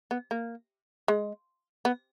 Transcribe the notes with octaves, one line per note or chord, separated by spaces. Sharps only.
B3
A#3
G#3
B3